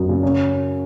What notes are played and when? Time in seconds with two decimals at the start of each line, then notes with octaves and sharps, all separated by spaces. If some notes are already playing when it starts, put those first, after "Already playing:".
Already playing: F#2
0.09 C#3
0.23 C#4